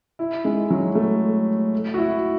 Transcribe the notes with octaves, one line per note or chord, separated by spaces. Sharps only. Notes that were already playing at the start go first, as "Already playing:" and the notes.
E4
G#3
F#3
A3
F#4
E4